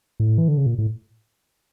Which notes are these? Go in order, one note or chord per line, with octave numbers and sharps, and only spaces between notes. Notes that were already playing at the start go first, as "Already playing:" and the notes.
A2
E3
D3
C#3
A#2
A2